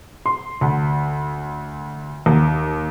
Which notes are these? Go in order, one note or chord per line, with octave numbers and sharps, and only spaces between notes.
C6
D2
D#2